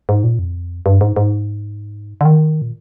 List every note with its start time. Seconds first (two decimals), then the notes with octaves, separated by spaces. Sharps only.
0.09 G#2
0.24 A#2
0.39 F2
0.86 G2
1.01 G#2
1.16 G#2
2.21 D3
2.25 D#3
2.62 A#2